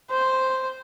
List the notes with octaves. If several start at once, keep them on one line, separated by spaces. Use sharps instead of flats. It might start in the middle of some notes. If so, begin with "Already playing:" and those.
C5